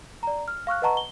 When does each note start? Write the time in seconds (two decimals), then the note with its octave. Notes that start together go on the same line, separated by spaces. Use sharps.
0.23 D5 A#5
0.48 F6
0.67 F5 C#6 F6 F#6
0.82 B4 D#5 F#5 A5 A#5 C#6
0.97 G7